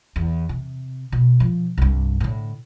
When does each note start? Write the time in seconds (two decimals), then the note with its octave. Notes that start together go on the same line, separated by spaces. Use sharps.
0.16 E2
0.49 C3
1.12 B2
1.40 F3
1.77 C2 G2
2.20 A2 D3